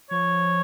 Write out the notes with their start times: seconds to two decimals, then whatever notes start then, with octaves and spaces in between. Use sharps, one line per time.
0.11 F3 C#5